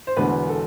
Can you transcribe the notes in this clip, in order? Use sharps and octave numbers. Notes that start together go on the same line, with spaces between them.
C5
E1 E2 D3 B4
A4